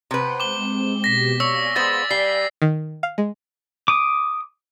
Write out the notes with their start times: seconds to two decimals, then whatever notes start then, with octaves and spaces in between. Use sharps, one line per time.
0.11 C3 B4 C5 F#5 G5
0.40 G#3 C4 D6 G7
1.04 B2 G4 A#6 B6
1.40 C#5 D5 F5 G#5 E6
1.76 G#3 B3 C5 A6
2.11 G3 C7 G7
2.62 D#3
3.03 F5
3.18 G#3
3.88 D6 D#6